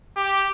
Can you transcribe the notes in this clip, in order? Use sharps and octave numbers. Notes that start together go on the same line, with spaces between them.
G4